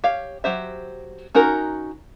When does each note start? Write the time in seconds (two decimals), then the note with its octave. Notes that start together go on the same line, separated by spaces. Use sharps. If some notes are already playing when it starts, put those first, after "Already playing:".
0.04 G4 C#5 F5
0.44 F#3 G4 C5 E5
1.35 C#4 D#4 F#4 A#4